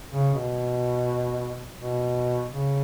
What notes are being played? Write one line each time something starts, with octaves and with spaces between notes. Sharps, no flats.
C#3
B2
B2
C#3